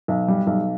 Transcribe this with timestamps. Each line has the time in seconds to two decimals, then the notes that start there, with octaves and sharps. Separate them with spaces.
0.08 B1
0.28 G3
0.47 B1